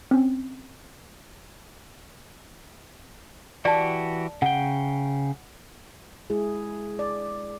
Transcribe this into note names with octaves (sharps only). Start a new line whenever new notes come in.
C4 C#4
E3 F#4 G4 D5 A5
C#3 F#5 G5
G#3 E4 G#4
D5